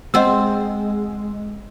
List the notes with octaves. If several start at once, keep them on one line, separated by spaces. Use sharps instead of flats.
G#3 C4 C5 D#5 F#5 E6